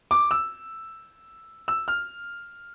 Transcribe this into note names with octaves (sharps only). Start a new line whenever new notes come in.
D6
E6
E6
F6